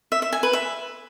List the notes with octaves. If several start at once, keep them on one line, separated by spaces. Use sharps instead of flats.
E5
E5
G#5
B4
E5